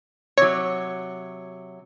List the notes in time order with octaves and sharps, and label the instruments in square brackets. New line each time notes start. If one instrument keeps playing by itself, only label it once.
[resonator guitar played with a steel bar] C3 F#3 [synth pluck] C#5